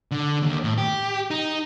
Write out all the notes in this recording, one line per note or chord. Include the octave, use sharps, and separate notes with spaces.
D3
D#2
A2
G4
D#4